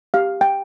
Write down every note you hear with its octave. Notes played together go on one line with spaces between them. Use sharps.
G4 F5
G5